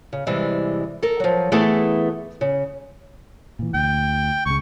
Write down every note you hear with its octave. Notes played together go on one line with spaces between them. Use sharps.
C#3
C3 E3 G3 G#3
A4 A#4
F3 F#3
E3 A3 B3 E4 G#4 A4
C#3
A#2 E3
D2 G5
C#2 C#3 C#6